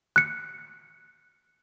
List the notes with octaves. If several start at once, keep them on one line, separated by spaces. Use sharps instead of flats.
F#6 C#7